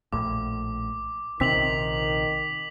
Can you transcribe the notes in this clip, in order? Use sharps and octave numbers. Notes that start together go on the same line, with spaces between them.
A#1 A2 D6
A#1 C3 D#3 C4 B6 F7 F#7